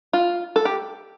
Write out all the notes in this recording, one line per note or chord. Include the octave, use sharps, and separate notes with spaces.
F4
A4
G4